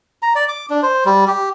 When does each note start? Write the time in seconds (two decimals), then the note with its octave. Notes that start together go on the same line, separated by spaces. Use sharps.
0.22 A#5
0.35 D5
0.49 D6
0.70 D4
0.83 C5
1.06 G3
1.28 G4